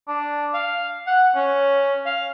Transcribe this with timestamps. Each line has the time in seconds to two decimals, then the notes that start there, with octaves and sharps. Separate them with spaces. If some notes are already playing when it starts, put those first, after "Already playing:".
0.08 D4
0.54 F5
1.07 F#5
1.35 C#4
2.06 F5